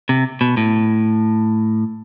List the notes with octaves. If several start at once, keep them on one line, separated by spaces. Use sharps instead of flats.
C3
B2
A2